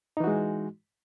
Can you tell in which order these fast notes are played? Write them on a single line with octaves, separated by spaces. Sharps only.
D#4 E3 F#4 G#3